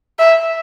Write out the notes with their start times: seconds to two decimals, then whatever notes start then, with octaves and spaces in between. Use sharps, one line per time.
0.19 E5